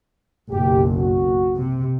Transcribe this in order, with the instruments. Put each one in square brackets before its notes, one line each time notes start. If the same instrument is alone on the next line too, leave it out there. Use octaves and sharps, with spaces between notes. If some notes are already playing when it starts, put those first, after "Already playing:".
[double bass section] F#1 B1 [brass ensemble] G4
[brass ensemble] F#4
[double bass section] C3